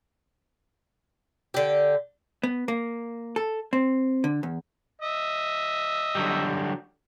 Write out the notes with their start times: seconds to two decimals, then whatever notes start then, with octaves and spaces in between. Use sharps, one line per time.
1.54 D3 G4
2.43 B3
2.68 A#3
3.36 A4
3.73 C4
4.24 D3
4.43 E2
5.01 D#5 E5
6.15 D3 F#3 G3